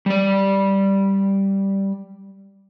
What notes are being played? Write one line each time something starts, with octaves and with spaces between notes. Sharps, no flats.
G3 D5